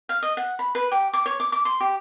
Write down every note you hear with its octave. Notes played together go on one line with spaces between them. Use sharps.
F5
D#5
F#5
B5
B4
G4
D6
C#5
D6
D6
C6
G4